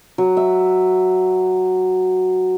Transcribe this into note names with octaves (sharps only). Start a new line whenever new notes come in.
F#3
E5